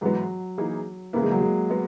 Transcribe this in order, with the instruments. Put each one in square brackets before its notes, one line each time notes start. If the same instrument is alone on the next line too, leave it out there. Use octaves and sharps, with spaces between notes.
[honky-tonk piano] G#2 E3 G#3 B3 [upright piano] F#3
[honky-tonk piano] E3 A#3 D#4 G#4
[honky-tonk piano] C#3 E3 B3 E4 [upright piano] A#3
[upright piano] G#3
F#3
G#3
[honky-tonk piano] G#3 B3